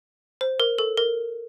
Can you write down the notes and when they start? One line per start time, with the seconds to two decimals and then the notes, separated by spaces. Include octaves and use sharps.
0.41 C5
0.60 A#4
0.78 A4
0.97 A#4